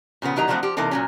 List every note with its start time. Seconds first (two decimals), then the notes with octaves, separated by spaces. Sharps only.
0.22 A#2 C#3 F3 B3
0.36 A2 D#3 F#3 G4 D#5 A#5
0.48 D3 F3 F#3 A3 B3 C4
0.63 F3 G4
0.77 C3 E3 A#3 D#4 A4
0.91 A#2 F#3 C#4